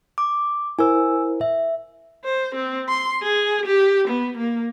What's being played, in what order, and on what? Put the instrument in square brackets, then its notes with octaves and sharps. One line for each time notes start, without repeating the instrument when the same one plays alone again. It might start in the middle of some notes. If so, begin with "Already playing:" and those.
[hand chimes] D6
[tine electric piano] E4 A#4 C5 [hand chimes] G#5 E6
[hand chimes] E5
[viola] C5
C4
C6
G#4
G4
B3
A#3